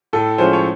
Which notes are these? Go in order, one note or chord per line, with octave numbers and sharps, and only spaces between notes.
A2 A4
F3 G#3 C#4 C5
C#5